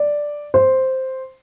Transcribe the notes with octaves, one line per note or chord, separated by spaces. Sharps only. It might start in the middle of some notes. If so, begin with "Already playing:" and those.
Already playing: D5
C5